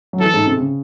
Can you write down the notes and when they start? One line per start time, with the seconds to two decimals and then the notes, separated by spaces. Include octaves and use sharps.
0.13 F#3
0.20 E3 A4
0.34 G#2
0.46 C3
0.57 C#3